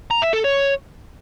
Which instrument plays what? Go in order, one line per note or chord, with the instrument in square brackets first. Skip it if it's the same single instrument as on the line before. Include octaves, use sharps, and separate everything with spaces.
[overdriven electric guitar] A#5
E5
A4
C#5